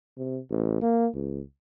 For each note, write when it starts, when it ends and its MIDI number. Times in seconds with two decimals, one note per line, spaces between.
0.17 0.39 48
0.50 0.80 33
0.81 1.07 58
1.14 1.41 37